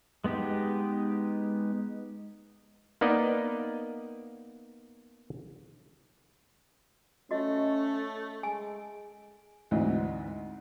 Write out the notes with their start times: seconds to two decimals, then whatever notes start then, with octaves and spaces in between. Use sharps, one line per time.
0.24 G#3 B3 D#4 G4
3.01 A#3 B3 D#4 D5 D#5
7.31 A3 C#4 F#4 D#5
8.43 G#3 G#5
9.71 D2 G#2 E3 C4 D#5